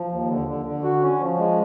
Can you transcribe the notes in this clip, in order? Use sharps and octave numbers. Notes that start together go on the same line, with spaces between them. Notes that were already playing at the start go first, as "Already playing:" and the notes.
Already playing: F3
D#2
D3
D3
D3
F#4
C#4
F3
G#3